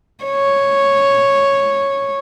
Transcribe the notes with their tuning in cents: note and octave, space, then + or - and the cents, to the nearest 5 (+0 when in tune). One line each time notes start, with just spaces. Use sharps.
C#5 -5